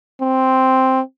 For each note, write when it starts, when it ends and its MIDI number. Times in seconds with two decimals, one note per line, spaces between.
0.22 1.01 60